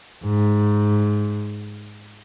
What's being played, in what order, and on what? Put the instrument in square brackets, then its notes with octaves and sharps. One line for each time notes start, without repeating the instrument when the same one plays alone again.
[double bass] G#2